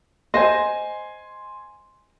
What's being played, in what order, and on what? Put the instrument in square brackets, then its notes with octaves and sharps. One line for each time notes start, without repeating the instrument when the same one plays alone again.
[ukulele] C5 D#5 [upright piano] G#5 C6